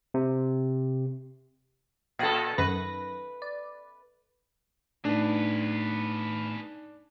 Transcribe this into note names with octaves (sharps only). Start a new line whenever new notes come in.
C3
A#2 A4 F5 B5 D#6
F#2 D#3 B4 A#6
D5
A2 B3 D4 D#4 G#4 B4